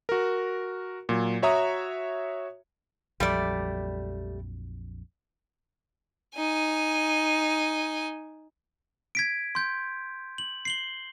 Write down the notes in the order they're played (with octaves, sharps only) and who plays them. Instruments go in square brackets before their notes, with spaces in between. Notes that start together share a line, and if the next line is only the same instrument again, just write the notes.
[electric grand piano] F#4 A#4
A#2 F#3
F#4 C#5 E5 A#5 D#6
[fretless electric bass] A#1 F2 F#3 [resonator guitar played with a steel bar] G3 A3 D5
[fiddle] D#4 G#5
[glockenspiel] G#6 B6 D7
C6 G6
F#7
C7 F#7 G7